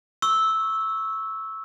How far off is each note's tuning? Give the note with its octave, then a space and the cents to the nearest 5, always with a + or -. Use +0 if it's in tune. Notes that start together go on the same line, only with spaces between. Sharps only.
C#6 -5 E6 -10